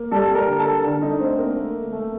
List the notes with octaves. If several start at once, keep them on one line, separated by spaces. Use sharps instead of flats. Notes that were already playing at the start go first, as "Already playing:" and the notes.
Already playing: A#3
G3 A4 A5
A#4 A#5
D3
A4 A5
D3
D#4 D#5
A3 C4 C5
A#3 A#4
A3
A3